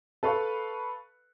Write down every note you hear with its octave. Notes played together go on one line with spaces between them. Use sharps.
A4 B4 F5 C#6